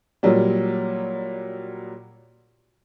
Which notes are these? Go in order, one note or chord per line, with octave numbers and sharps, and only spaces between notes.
A#2 F#3 G3